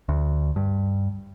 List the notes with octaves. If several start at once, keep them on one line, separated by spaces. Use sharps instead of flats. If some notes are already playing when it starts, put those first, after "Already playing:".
D2
G2